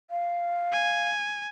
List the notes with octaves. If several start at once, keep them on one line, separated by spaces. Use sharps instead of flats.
F5
G#5